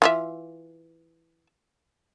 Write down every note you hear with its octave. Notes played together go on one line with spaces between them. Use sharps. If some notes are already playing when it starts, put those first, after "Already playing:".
E3 F4 E5